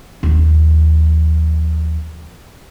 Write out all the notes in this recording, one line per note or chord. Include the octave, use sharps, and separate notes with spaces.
D#2 F3